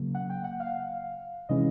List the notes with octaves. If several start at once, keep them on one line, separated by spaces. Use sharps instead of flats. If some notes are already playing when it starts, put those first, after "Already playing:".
Already playing: C#3 F#3 A#3
F#5
G5
F#5
F5
C3 E3 G#3 C#4 E4 D#5